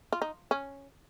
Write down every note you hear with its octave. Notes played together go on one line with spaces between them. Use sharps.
F4
D#4
C#4